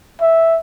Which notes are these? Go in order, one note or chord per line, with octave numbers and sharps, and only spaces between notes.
E5